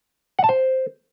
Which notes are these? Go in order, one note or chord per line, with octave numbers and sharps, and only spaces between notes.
F#5
A5
C5